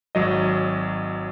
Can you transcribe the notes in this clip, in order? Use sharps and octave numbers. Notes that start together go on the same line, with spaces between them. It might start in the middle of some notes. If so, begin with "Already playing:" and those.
G#1 F#3 D#5